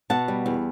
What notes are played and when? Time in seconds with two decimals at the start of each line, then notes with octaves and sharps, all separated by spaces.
0.10 B2 F#5 A5
0.28 G3
0.46 E2